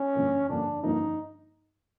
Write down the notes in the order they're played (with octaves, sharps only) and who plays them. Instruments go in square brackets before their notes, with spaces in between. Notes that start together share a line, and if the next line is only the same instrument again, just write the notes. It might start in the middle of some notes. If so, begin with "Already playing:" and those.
Already playing: [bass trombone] C#4
[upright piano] G2 D3 F3 A#3
[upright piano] G2 D3 F3 A#3 [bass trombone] D4
[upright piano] G2 D3 F3 A#3 [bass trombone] D#4